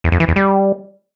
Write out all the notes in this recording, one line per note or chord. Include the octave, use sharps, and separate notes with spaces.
E2
F2
E3
E2
G3